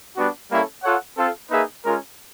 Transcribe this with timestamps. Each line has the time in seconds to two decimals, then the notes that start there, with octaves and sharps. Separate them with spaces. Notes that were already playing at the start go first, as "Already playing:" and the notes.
0.16 G3 B3 D4 F#4
0.49 G3 A#3 C#4 E4 A4
0.83 F4 A4 C#5 F#5
1.17 C4 F4 A4
1.51 A#3 D#4 G#4 B4 E5
1.83 G#3 C#4 F4 A#4